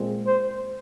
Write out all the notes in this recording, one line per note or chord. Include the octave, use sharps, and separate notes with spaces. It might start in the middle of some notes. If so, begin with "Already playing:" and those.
Already playing: A#2 G#3 C4
C5